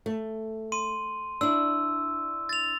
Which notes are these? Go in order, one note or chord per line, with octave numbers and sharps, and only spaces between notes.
A3
C6 D#7
D4 E4 E6
A6 F7